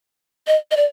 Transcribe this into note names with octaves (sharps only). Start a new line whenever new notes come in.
D#5
D#5
D5